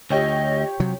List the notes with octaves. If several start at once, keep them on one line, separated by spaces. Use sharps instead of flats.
D2 F4 G4 C#5 D#5
C3 F#3